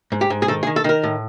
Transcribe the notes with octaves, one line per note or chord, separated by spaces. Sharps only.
G#2
G4
G#2
G#4
D#3 A4
G#4
D#3
A4
D#3 A#4
A2